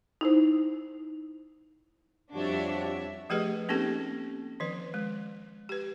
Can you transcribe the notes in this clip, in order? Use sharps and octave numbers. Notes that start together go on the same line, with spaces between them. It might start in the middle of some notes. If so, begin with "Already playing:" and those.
D#4 E4 C5
F2 F3 G3 D4 F#4 G4 C#5 E5
F3 A3 G4 G#4 B4 D#5
A#3 C4 C#4 D#4 G4 A4
D#3 F3 B4
G#3
G4 B4